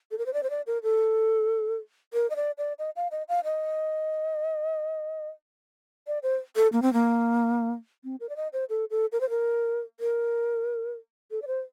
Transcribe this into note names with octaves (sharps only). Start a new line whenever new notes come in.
A4
A#4
C5
D5
C5
D5
A#4
A4
A#4
D#5
D5
D5
D#5
F5
D#5
F5
D#5
D5
C5
A4
A#3
C4
A#3
C4
A#4
D5
D#5
C5
A4
A4
A#4
C5
A#4
A#4
A4
D5
C5